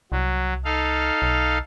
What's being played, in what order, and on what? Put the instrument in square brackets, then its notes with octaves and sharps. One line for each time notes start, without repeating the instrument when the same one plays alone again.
[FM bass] C2 [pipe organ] F#3
[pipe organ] D#4 A4 F5
[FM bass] B1